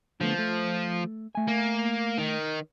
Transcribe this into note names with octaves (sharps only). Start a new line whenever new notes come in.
D3 F3 A3 B3
A3
A3 G#5
A#3
D#3